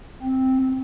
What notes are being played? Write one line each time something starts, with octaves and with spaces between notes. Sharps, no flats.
C4